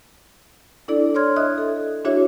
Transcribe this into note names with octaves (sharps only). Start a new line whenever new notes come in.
D4 E4 A4 D5
C#5 D5 C6 F6 G#6
D#5 E5 D#6 F#6
A4
D4 E4 F#4 G#4 C#5 E5